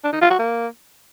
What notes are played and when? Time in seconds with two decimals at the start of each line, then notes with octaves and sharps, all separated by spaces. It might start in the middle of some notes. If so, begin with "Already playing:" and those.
0.04 D4
0.13 D#4
0.21 F4
0.30 F#4
0.39 A#3